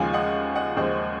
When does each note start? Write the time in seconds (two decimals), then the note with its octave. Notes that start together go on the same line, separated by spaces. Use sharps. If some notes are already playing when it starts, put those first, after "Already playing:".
Already playing: D#2 C#3 F3 G#3 F5 G#5
0.13 D#5 F#5
0.55 D#5 F#5
0.76 D#2 C#3 F3 G#3 C5 D#5